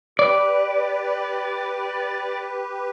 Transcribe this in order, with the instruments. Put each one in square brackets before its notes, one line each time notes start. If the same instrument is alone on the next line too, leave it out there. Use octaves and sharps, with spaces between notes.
[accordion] G4 B4 [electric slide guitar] D5